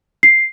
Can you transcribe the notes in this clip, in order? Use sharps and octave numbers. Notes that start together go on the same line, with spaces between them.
C7